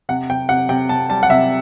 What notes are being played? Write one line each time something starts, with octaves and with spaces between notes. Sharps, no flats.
C3 F#5
C3 G5
C3 F#5
C3 G5
C3 A5
G3 A5
F#5
C3 E5